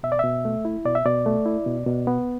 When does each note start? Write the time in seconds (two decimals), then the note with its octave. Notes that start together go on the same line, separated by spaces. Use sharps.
0.03 B2 E5
0.12 D5
0.19 B2 E5
0.45 A3
0.65 E4
0.85 B2 D5
0.95 E5
1.05 B2 D5
1.26 A3
1.46 E4
1.66 B2
1.86 B2
2.07 B3